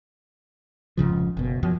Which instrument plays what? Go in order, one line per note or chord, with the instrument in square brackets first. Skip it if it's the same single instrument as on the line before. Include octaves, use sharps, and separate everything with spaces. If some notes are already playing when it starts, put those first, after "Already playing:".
[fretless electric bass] F1 G#2 C#3 F3
F#1 B2
F#2 F3 F#3